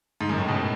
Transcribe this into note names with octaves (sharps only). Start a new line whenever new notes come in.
G#2
F#2
A2
B2